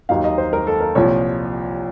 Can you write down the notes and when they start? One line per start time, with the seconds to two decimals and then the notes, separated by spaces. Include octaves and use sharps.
0.09 D#2 D#3 F#3 A#3 D#4 F5
0.24 D#5
0.38 C5
0.53 A#4
0.67 A4
0.80 A#4
0.95 C2 A#2 F3 C#5